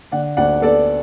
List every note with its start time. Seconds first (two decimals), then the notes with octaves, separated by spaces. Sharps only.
0.12 D3 D5 F#5
0.37 D2 D5 F#5
0.62 B3 A4 D5